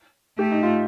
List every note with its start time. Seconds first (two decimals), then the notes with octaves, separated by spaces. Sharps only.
0.38 A3 G4
0.51 D#4
0.63 F4